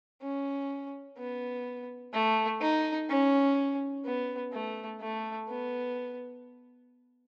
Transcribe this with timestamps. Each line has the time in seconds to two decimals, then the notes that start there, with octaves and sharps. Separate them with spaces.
0.22 C#4
1.17 B3
2.13 A3
2.61 D#4
3.09 C#4
4.05 B3
4.52 A3
5.00 A3
5.48 B3